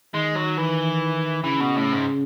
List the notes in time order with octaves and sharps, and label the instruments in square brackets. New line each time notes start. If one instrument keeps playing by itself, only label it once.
[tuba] D#3 [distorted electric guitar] G#3
[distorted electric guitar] F#3
E3
[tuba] C#3 [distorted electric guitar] E3
[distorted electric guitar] B2
A2
G#2